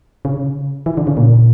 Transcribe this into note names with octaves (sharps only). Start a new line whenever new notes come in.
C#3
E3
D3
C#3
A#2